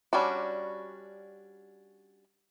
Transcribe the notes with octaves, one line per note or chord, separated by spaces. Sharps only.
G3 C#4 D4 F#4